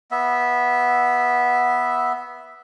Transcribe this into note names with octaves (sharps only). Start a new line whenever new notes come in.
B3 E5